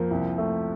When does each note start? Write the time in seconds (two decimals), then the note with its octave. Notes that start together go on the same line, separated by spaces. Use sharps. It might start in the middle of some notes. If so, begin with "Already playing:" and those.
Already playing: F2 F3 A#3
0.11 C2
0.38 A3